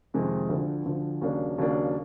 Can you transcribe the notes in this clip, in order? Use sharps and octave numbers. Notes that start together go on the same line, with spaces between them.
F2 C3 D#3 G#3 C4
D2 D3 F3
D2 D3 F3
D#2 C#3 F#3 A#3 D4
D#2 C#3 F#3 A#3 D4